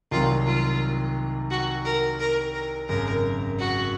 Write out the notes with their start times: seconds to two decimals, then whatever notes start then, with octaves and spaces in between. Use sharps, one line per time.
0.11 C2 C3 D#3 F#3 F4
0.46 F4
1.50 F#4
1.85 A#4
2.20 A#4
2.54 A#4
2.88 G#1 F#2 C#3 A#4
3.59 F#4